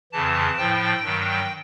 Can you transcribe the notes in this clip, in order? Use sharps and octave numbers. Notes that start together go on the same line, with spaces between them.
F2 C#3 E3 A5
A2 F3 G5
G2 D#3 F#3